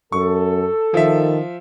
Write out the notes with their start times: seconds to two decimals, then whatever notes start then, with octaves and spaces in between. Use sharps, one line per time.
0.12 F#2 A4 C#6
0.94 D#3 F3 E5